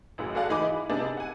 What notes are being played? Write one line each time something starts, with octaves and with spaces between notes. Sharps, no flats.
A1 F#2 B2 G#4
F#4 G#4 A4 D5 F5 F#5
G#1 E3 D#4 G#4 B5 D6
E4
C3 B3 D4 D#4 G#4
F#5 G#5